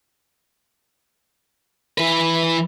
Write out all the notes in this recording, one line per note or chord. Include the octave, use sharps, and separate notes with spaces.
E3 B4